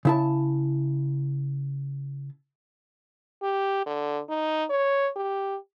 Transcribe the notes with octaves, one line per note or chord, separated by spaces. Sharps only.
C#3 E4 A5
G4
D3
D#4
C#5
G4